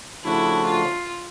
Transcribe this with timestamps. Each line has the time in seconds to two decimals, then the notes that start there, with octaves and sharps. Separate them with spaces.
0.24 C#3 F3 A3 D4 E4 F#4
0.65 F4